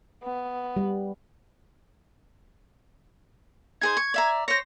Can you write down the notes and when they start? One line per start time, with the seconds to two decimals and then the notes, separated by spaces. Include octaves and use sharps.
0.23 B3
0.76 G3
3.81 D#4 G#4 C5 G#6
3.97 C#6
4.14 D5 E5 A#5
4.48 C5 C#5 A#6